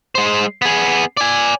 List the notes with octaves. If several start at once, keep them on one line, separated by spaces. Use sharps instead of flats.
G#3 C5
B3 G#4
D5 G#5